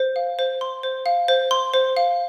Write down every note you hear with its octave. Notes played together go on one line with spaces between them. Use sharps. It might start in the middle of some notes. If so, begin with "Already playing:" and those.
Already playing: C5
F5
C5
C6
C5
F5
C5
C6
C5
F5